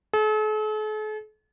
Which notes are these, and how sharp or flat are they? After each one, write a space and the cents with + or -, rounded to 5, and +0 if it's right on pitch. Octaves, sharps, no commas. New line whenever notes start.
A4 -45